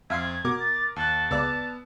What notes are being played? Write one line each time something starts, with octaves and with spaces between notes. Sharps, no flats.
F2 E5 F5 C6 G#6
B2 A#4 D6
A6
D#2 A5 F#6
C#2 B3 D5 E6